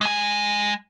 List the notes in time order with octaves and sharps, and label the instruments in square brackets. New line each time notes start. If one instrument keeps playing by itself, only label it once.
[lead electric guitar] G#3 G#5